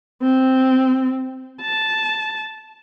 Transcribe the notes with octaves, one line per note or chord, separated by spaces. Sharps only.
C4
A5